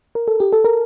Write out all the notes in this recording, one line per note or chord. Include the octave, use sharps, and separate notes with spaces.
A#4
A4
G4
A4
A#4